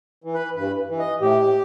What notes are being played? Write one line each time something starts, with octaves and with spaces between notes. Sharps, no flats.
E3
B4
G2 B4
E3
D#5
A2 G4